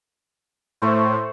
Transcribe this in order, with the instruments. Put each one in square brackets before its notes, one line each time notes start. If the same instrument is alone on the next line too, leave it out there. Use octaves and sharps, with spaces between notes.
[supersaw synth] A2 [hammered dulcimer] A3 C5 C#6